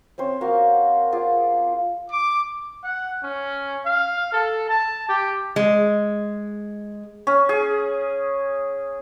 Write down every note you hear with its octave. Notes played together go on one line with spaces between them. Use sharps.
C4 C#4 C5
A#3 F#4 F5
F4 G#4 D5
D6
F#5
C#4
F5
A4
A5
G4
G#3
C#4
G#4